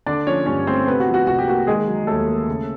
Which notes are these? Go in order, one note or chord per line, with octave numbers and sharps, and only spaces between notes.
D3 D4 D5
F3 C#4 C#5
G2 C#4 C#5
A3 C4 C5
C3 B3 B4
F#4
F3
F#4
C2 F#4
G4
A#3 F#4
D#3 G#3 G#4
F#3
D#2 A3 A4
A#3
C#3